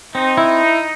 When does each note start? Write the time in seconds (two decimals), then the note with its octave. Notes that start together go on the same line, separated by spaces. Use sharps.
0.15 C4 D#4
0.38 E4